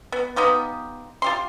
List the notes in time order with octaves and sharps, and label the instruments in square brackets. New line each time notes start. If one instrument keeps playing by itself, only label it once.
[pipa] B3
B3 D#4 F4 G4
F4 G4 C6